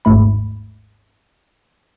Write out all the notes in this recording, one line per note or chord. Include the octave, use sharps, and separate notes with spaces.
G#1 D#2 G#2 A3 B5